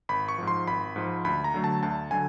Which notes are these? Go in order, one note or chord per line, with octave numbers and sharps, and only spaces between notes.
G#1 B5
C#6
G#2 F3
C6
G#1 B5
G#2 F3
D2 B5
A#5
D3 F#3 A3
A5
D2 A5
D3 F#3 G#5